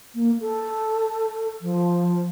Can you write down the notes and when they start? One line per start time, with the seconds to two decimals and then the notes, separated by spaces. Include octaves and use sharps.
0.15 A#3
0.41 A4
1.61 F3